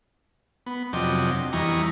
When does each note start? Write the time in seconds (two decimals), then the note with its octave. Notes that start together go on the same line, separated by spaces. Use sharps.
0.66 B3
0.93 F2 C3 F#3 D4 D#5 G5
1.53 E2 E3 G3 D#5 A#5 C#6